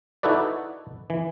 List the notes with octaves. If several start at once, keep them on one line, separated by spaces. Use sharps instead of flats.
D#4 E4 F#4 A4 B4 D5
E3